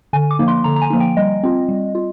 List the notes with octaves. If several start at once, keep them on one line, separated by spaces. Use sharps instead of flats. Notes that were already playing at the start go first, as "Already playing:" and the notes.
D3 G#5
D6
F3 A#3 D#4
C6
D3 A#5
A#5
G#5
F3 A#3 D#4
G5
G3 D#5
C4 F4
G3
F4